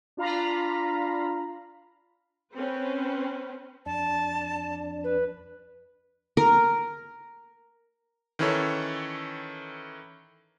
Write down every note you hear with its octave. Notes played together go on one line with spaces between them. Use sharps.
D4 F4 F5 A#5 B5
C4 C#4 B4 C5
F2 D4 A5
B4
A#4
D#3 E3 C#4 E4 A4 C#5